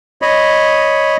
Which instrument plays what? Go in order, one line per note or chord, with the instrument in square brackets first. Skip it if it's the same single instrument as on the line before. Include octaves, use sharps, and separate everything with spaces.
[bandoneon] C#5 D#5 B5